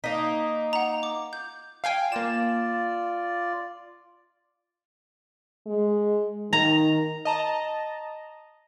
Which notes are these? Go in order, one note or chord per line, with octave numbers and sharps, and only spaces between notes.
A#3 D#4 B6
F#5 A#5
D6
G6
F5 G5 G#5
A#3 F4 D5 E7
G#3
D#3 A#5
D#5 A5 A#5